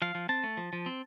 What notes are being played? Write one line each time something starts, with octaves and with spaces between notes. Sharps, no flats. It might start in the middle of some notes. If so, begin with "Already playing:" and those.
F3 F5
F3
C4 A5
A3
F3
F3
C4